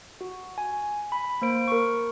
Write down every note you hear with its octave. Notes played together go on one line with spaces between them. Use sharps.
F#4
G#5
B5
A#3 C5 D7
A#4 C#6